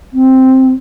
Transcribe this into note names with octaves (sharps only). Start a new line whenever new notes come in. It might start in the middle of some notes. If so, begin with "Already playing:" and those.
C4